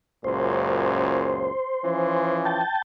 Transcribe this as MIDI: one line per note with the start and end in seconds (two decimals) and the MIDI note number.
0.24 1.51 37
0.24 1.51 42
0.24 1.51 46
0.24 2.38 72
1.85 2.60 52
1.85 2.60 53
1.85 2.60 61
2.45 2.82 79
2.45 2.82 81